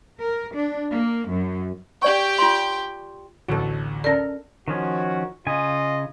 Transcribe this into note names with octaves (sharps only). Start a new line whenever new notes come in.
A#4
D4
A#3
F#2
G4 D5 G5 C#6
F4 C6
A1 D2 B2 F#4 A4
C#4 A4 A#4 D5
D#3 F3 C#4 F#4
C#3 F4 D#5 G#5